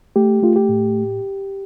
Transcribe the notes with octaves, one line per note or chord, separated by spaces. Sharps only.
A3 G4
A3 F4
G4
A2